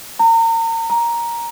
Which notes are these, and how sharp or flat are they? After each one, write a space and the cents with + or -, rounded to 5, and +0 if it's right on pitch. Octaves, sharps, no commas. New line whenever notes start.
A#5 -35
A#5 +5